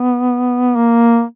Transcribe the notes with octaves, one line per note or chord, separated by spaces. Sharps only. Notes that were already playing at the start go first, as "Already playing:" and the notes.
Already playing: B3
A#3